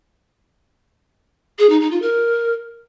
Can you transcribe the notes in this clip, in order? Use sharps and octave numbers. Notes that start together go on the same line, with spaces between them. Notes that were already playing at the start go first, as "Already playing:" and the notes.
G#4
D#4
D#4
F4
A#4